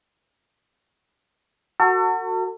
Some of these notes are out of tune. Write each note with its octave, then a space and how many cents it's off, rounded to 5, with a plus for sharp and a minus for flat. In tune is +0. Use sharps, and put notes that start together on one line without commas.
F#4 +0 A4 +40